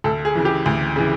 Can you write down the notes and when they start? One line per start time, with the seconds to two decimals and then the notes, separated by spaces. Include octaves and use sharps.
0.04 D2 A4
0.25 G#4
0.35 C#3 E3
0.45 G4
0.66 D2
0.96 C#3 E3